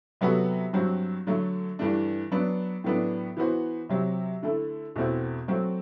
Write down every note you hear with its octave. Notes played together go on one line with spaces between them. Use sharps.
C3 F#3 B3 F#4 A4
G2 F#3 C4 F#4
D3 F#3 A3
G2 E3 A3 D4
F#3 B3 D4
A2 F#3 B3 D4
E3 B3 F#4 C5
C3 F#3 C4
D3 A3 E4 A4
E2 B2 A3 C4 F#4
F#3 A3 C4 F#4